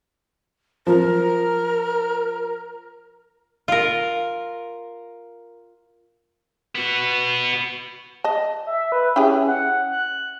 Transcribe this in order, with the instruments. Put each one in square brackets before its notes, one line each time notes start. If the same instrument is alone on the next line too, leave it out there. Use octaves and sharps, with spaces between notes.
[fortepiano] F3 [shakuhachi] A#4
[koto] F4 A#4
[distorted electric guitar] B3 F#4
[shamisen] D#5 A5
[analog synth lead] E5
B4
[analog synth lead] C#4 [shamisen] E4 G4 G#4
[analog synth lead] F#5
F#6